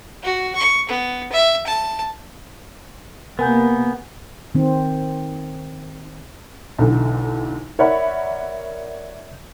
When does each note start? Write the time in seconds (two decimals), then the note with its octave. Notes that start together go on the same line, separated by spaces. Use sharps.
0.23 F#4
0.55 C#6
0.89 B3
1.32 E5
1.66 A5
3.39 C3 A#3 B3 A#4 G#5 G6
4.55 D#3 C4
6.78 B1 D3 E3
7.79 A#4 C#5 D5 E5 F#5 B5